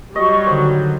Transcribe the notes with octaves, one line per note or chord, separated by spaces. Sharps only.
F#3 G3 D#5 C#6
D3 D#3 C5